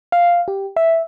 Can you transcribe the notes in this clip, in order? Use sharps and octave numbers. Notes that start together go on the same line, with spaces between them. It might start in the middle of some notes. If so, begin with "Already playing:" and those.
F5
G4
E5